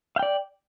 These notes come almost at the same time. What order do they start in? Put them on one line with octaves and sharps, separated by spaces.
F5 G5 D5